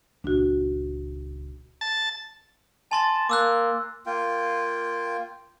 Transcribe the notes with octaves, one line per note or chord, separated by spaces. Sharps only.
D#1 C#2 D4 F#4
A5
G#5 A5 C6 A6
A#3 D6 E6 F#6
A#3 F4 G5